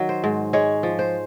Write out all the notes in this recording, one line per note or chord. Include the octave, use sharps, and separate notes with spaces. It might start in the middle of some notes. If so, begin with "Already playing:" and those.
Already playing: D#3 F#3
C5
G#2
G#3 C#5
F3
C5